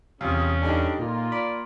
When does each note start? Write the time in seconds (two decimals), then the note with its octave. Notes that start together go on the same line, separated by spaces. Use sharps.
0.21 E2 C3 C#4 F4 G#4 F5
0.62 G3 D4 D#4 G#4 A4
0.99 A#2 A#3 F4
1.32 D5 B5